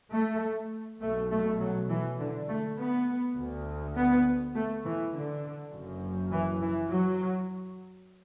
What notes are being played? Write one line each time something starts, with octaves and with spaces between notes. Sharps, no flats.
A3
B1 B2 A3
A3
F#3
E3
D3
A3
B3
D2
B3
A3
E3
D3
F#1 F#2
E3
E3
F#3